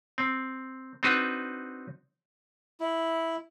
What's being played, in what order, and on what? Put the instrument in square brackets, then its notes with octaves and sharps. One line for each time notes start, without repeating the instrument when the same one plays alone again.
[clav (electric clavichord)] C4
C4 D4 D#4 F#4 B4
[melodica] E4